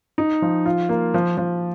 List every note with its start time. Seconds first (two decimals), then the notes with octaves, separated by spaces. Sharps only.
0.18 D#4
0.42 F3
0.66 F4
0.89 A#3
1.14 F3
1.37 F3